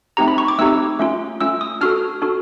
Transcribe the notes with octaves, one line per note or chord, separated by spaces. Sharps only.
A3 C4 D#4 G4 A#5
B5
C#6
D6
A3 C4 D#4 G4 E6
A3 C#4 F4
A3 C#4 F4 E6
D#6
D4 F#4 A4 F6
D4 F#4 A4